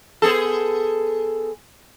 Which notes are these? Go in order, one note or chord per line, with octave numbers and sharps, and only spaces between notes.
B3 G#4 A4